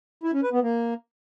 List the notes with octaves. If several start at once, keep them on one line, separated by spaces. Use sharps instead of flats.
E4
C#4
B4
B3
A#3